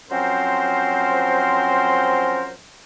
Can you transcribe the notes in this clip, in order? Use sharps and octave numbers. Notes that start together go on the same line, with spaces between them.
F3 F#3 C4 C#4 A#4 C5